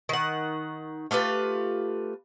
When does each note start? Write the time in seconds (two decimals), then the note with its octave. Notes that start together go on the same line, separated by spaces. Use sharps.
0.09 D#3 F#5
1.11 A3 F4 G4 B4